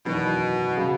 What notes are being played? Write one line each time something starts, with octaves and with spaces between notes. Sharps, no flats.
F#1 E2 B2 D#3
C#3 F#3